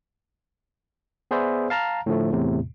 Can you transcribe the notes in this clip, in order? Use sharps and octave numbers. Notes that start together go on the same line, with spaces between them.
B3 G#4 B4 C5 D5 E5
F5 A5 A#5 F6
A2 D3 F3 A3
E2 A2 C3